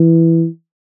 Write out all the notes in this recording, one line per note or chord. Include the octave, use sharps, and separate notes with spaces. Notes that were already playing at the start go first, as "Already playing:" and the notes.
Already playing: E3